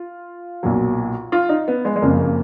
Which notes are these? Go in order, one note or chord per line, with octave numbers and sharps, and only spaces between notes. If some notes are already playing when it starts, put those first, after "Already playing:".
Already playing: F4
B1 A#2 F#3
F4
D#4
B3
G#3
G#3
F#1 F2 C#3 A#3
A#3